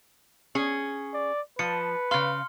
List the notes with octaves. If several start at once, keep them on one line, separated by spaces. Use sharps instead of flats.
C#4 G#4
D5
F3 B4 C#7
C#3 F5 C6 F6